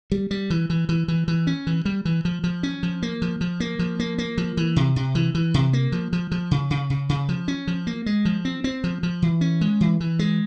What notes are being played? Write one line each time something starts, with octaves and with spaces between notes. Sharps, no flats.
G3
G3
E3
E3
E3
E3
E3
C#4
E3
G3
E3
F3
F3
C#4
F3
A#3
F3
F3
A#3
F3
A#3
A#3
F3
E3
C3
C3
E3
E3
C3
A#3
F3
F3
F3
C#3
C#3
C#3
C#3
F3
C#4
F3
A#3
G#3
F3
C4
C4
F3
F3
E3
C#4
G#3
E3
E3
G#3